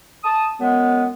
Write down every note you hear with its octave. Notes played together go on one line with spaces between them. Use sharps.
A5 D#6
F#2 G#3 B3